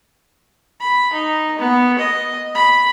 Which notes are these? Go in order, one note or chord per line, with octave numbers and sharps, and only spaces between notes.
B5
D#4
B3
D#5
B5